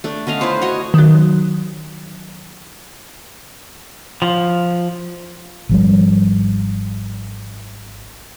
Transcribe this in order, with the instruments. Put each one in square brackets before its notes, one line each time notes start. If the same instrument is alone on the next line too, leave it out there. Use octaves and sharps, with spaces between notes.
[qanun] A3 D4
D3 C#4 D#5 F5
E4 F4 B4 C5
F#4 C#5 D#5
[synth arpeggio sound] D#3 F#3
[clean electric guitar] F3
[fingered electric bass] G#1 F3 G3